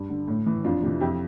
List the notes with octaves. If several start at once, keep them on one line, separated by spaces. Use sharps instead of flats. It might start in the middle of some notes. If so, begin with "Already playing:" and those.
Already playing: G2
D3
A2
E3
F2 D4 F4
C3 E3
F2 E4 G4